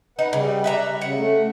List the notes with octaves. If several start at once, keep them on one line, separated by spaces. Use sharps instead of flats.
D#4 B4 F#5
C#3 G3
B4 E5 A#5
C#3 F#5
A3